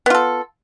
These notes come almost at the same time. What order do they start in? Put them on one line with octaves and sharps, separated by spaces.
B3 F4 A4